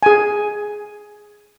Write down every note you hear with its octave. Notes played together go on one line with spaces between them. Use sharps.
G#4 G#5